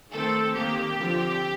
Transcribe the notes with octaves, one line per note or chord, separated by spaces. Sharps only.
D#3 A3 C4 A4
D#3 A#3 G4
D3 F3 C4